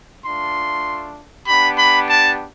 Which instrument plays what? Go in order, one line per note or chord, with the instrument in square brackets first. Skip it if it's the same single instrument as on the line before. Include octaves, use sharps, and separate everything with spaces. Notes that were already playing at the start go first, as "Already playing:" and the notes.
[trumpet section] A3 D4 F4 C6
B3 D4 G4 B5
B5
A5